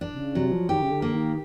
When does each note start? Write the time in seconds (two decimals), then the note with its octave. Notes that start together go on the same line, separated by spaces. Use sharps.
0.01 D4
0.13 C3
0.18 C#3
0.35 C3 F#3
0.52 F3
0.69 D#3 G4
0.82 C#3
0.91 D3
1.02 A#3
1.14 D#3